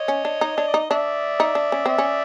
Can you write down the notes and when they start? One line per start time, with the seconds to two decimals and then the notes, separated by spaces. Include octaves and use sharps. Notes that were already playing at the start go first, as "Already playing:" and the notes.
Already playing: C#5 D#5
0.08 C#4
0.25 D4
0.41 D#4
0.56 D4 C#5
0.68 D5
0.74 D#4
0.79 D#5
0.90 D4 D5 E5
1.40 D#4
1.55 D4
1.72 C#4
1.86 C4 D5 E5
1.98 C#4